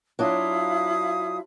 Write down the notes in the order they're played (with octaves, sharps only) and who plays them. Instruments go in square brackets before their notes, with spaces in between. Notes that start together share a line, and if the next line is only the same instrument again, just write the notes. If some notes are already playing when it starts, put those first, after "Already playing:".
[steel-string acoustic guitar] F#3 D4 F4 [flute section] E4 F5 D#6